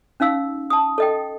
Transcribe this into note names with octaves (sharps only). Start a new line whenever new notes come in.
C#4 D#4 F5 E6
A5 D#6
A4 D#5 G5